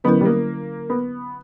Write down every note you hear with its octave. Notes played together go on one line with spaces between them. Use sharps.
D3 F#3 B3 C#4 E4 A#4
G3
A#3
B3